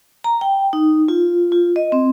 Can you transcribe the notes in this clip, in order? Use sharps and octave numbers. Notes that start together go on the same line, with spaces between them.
A#5
G5
D#4
F4
F4
D#5
C4